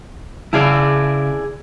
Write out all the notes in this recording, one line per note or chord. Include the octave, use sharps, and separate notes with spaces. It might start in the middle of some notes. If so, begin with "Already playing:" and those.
C#3 E4 G#4 D5 F5 A5